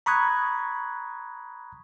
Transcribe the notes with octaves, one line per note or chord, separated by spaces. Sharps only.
A#5 B5 C#6 D#6 F#6 G#6